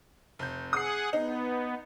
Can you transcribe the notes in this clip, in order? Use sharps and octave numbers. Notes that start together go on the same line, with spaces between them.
F1 G6
G#4 F#5 D#6 C7
B3 D#4